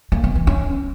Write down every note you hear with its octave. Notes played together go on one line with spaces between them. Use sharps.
A#3
B3
E3
C#4